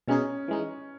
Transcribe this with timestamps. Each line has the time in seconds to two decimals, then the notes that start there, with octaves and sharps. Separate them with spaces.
0.08 B2 G#3 C#4 D#4 G#4
0.48 E3 G#3 D#4